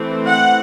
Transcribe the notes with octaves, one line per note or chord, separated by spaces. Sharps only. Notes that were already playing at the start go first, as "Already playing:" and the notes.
Already playing: E3 A3 C4
F#5